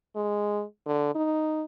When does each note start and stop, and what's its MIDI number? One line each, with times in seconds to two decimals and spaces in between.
0.16 0.63 56
0.86 1.11 50
1.15 1.65 63